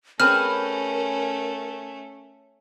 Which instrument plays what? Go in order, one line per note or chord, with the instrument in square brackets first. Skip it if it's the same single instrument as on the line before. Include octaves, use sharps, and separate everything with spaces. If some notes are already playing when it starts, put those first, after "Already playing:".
[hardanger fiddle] A3 C#4 [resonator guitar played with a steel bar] C4 G#4 B4 [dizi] A#4 [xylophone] F6